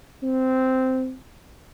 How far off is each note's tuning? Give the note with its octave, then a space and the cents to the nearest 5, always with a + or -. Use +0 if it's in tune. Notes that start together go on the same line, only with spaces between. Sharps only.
C4 -10